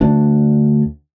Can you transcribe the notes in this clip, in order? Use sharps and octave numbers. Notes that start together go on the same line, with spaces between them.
D2 D4